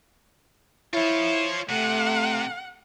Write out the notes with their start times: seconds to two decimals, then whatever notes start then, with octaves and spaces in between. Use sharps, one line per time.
0.94 E4 F4 C5 C#5
1.69 C3 A3 F#5